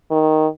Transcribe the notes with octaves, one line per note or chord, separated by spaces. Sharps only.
D#3